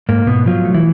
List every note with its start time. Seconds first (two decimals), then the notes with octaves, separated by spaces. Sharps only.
0.09 G#2 A#3
0.27 G#2 B2 B3
0.46 F3 F#3 F4
0.65 A3
0.74 E3 E4